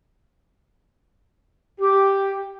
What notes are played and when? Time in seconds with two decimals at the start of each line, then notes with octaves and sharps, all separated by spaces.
1.80 G4